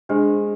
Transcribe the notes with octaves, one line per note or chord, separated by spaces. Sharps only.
G#3 D4 G4 C5